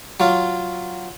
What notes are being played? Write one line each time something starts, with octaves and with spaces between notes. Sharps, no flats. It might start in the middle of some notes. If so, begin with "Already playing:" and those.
F#3 F4